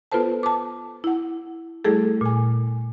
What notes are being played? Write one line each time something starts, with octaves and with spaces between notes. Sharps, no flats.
B3 F4 A4 B4 C5 A5
A5 D6
E4 F#5
G3 A3 E4 G#4 A4
A#2 G#5